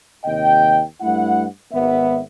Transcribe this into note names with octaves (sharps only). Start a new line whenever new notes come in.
D#2 C3 D#5 G5
G2 A3 E4 F#5
G#1 B3 E5